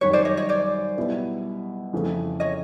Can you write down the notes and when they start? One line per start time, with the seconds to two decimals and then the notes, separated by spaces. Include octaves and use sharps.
0.01 F#2 D#3 G3 B4 C#5
0.13 C5 D5
0.25 C#5 D#5
0.37 C#5 D#5
0.49 C5 D5
0.97 B2 G3 B3 E4
1.93 F2 C#3 E3 A3
2.40 C#5 D#5